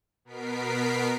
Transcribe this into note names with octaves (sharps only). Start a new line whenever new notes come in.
B2 B3 A#4 B6 C7 D7